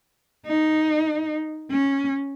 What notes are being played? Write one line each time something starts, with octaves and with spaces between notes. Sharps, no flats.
D#4
C#4